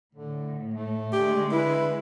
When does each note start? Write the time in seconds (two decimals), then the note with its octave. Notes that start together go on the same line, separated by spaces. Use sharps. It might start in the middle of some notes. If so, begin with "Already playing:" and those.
0.15 A2 D3
0.74 A3
1.12 D3 G#3 G4
1.51 E4 B4